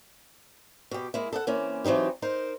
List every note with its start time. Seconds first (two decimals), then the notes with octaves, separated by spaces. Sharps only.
0.91 B2 G4
1.14 G#3 A#3 E4
1.33 A4 D#5 F#5
1.47 E3 A#3 C4 C#4
1.84 E3 F#3 C4 D#4 G4
2.22 D#4 A#4 C5